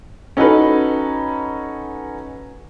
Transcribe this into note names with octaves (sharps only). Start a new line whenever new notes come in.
C#4 D#4 F#4 A4 B4